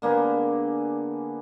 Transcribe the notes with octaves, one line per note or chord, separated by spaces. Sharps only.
D3 A#3 B3 G#4